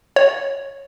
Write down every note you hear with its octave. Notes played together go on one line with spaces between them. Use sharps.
C#5